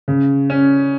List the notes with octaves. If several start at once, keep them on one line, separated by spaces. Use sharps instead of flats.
C#3
C#4